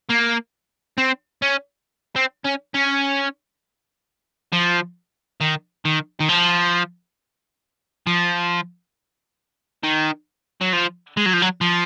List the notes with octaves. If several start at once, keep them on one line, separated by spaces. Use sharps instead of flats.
A#3
C4
C#4
C4
C#4
C#4
F3
D#3
D#3
D#3
F3
F3
D#3
F#3
F3
G#3
F#3
F3
F#3
F3